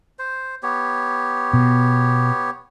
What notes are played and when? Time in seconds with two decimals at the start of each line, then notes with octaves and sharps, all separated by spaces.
0.19 C5
0.63 B3 G4 C#5
1.53 B2